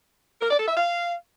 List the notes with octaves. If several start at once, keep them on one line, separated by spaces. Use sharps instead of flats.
A#4
D5
A4
E5
F5